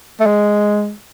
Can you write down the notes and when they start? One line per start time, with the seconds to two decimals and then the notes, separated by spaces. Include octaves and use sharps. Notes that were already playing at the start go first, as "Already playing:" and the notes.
0.21 A3
0.27 G#3